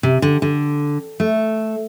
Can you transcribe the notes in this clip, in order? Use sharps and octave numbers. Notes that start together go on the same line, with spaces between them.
C3
D3
D3
A3